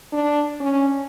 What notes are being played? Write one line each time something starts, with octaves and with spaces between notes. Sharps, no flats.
D4
C#4